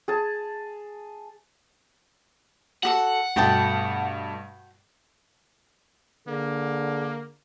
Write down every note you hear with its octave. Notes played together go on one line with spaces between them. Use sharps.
G#4 A5
F#4 G4 A4 F#5
G2 B2 A3 F#4 G5 A5
D3 A#3 G#4